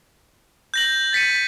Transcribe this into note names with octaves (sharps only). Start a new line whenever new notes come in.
G6 A#6 F#7
A6 B6 C#7 D#7